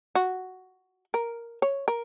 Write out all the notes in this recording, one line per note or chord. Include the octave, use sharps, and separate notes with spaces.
F#4
A#4
C#5
A#4